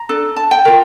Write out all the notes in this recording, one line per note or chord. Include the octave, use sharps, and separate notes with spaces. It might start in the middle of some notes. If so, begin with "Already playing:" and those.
Already playing: A#5
D4 A4
A5
G5
F4 A#4 A#5